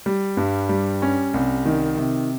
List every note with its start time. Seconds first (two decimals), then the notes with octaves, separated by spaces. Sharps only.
0.06 G3
0.37 G2
0.69 G3
1.02 C#4
1.34 C2
1.66 D#3
1.98 C3